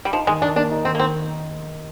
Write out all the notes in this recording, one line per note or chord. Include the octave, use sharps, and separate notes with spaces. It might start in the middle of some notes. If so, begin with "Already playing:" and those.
G3
F3 D#4
D#3 G#3
D#3 D4
A#3 D4
D#4
D#3 C4
A#3
D#3 C4